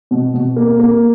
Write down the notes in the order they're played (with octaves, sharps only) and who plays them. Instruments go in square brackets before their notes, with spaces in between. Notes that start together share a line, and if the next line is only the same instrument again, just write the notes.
[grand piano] B2
B2
A#3
A#3